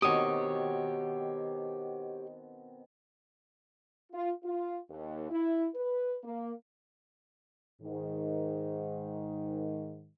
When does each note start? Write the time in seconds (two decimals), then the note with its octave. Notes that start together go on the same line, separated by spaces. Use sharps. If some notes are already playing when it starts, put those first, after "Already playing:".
0.02 B2 D#3 C4 G4 C#5 D#6
4.12 F4
4.44 F4
4.90 D#2
5.30 E4
5.75 B4
6.24 A#3
7.82 G#2 D#3